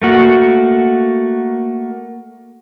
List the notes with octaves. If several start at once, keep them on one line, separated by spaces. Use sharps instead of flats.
A3 A#3 F#4